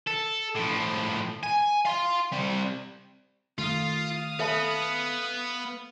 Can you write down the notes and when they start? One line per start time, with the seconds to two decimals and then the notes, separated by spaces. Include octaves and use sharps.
0.07 A4
0.55 A2 F3
1.43 G#5
1.85 F5 C6
2.33 G3 C4
3.58 D#3 A3 F4 F5 D#6
4.39 B3 A4 E5 A5 B5